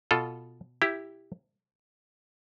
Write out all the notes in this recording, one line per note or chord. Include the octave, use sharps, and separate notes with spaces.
B2 F4 A4
E4 G4